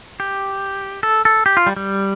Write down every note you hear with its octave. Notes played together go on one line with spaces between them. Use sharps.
G4
A4
A4
G4
F4
G3
G3